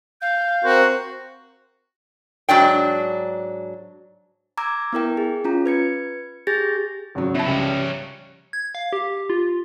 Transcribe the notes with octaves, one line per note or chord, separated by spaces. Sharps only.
F5 G6
C4 F#4 A#4 C5
G#2 F#3 D4 G5
A#5 D6 E6 G#6
B3 E4 A#4 G5
G#4
C#4 F4 A#5
B4 G#6 C#7
G4 G#4 G6 A6 A#6
G#1 C#3 F#3
B2 E4 A5
C#2 G3 C#4 E5 C#7
G#6
F5
G4
F4